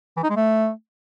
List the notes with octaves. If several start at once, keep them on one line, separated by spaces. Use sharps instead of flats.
E3
D#4
G#3
A3